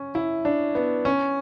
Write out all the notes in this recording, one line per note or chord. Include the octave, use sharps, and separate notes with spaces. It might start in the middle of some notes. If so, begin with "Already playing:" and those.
Already playing: C#4
E4
D4
B3
C#4